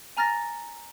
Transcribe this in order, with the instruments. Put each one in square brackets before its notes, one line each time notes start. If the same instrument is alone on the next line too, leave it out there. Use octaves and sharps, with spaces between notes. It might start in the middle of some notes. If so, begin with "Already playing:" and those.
[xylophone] G#5 A#5 F6 A6 A#6